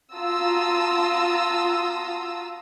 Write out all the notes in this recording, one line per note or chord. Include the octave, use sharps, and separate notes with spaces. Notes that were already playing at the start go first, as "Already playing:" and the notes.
F4 F#4 A5 A#5 D#6 E6